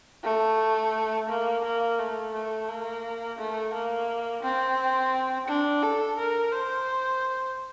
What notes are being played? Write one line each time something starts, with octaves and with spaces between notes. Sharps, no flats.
A3
A#3
A#3
A3
A3
A#3
A3
A#3
C4
D4
A4
A#4
C5